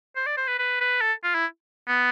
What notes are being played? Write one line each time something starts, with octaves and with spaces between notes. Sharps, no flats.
C5
D5
C5
B4
B4
B4
A4
F4
E4
B3